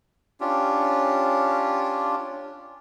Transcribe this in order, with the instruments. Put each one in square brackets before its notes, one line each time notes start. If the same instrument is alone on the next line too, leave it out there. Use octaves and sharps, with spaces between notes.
[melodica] C#4 D4 F4 G4